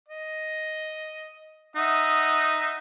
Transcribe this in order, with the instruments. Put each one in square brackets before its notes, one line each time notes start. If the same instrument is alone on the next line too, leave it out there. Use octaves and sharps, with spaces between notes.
[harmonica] D#5
[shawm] D#4 [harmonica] E5 F#5 D#6